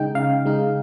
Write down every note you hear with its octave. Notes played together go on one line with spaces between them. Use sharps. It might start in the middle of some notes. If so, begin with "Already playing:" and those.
Already playing: C#3 G#3 D#4 G5
C#3 F5
G#3 D#4